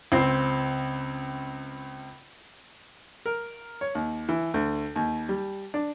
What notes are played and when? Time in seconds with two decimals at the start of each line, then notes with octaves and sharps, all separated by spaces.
0.12 C#2 C4 C7
3.26 A#4
3.81 C#5
3.95 D#2
4.29 E3
4.54 D2
4.96 D#2
5.29 G3
5.74 D4